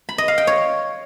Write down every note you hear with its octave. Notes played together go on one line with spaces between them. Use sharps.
B5
D#5
F5
G5
C#5